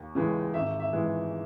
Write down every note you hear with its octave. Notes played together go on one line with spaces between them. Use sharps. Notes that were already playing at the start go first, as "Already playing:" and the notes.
Already playing: D#2
C#3 E3 G#3
G#1 E5
E5
E3 G#3